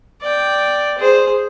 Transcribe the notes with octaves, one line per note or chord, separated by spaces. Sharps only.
D5 G5
G#4 C5